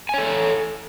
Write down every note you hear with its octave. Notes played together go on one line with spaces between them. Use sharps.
A4 C#5 G#5